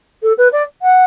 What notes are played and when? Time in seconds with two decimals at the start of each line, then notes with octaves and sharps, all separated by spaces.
0.22 A4
0.38 B4
0.52 D5
0.82 F#5